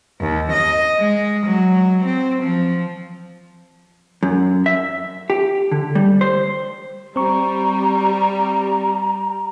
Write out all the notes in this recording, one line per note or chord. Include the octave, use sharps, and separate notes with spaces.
D#2
D#5
G#3
F#3
C4
F3
F#2
E5
G4
D3
G3
C5
G3 C4 A#5 C#6